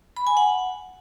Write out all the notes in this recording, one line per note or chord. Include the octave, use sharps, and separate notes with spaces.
B5
G#5
F#5